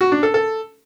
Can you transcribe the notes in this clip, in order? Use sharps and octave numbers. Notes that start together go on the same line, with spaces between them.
F#4
D4
A4
A4